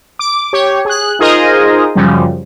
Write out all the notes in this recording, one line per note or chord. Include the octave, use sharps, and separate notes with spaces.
D6
G4 C#5
G#4 F#6
D#4 F4 G#4 A#4 C5 D#5
F#2 C#3 F3 G3